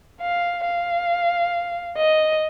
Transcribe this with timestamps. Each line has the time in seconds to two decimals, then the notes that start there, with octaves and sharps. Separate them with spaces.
0.21 F5
0.65 F5
1.97 D#5